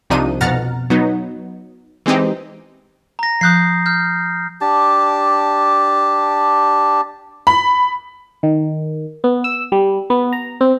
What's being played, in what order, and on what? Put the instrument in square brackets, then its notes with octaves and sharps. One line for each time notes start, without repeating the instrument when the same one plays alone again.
[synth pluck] C2 C3 F3 D4 D#4 D#7
F2 B2 F#5 A#5 F6 A6
F#3 B3 D#4
E3 G#3 C4 D#4 G4
[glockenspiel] A#5 A#6
[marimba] F3 F#6 [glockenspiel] D#6 G6 C7
[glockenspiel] F6 G6
[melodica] D4 G4 A5
[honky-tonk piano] B5
[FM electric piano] D#3
B3
E6
G3
B3
A#5
C4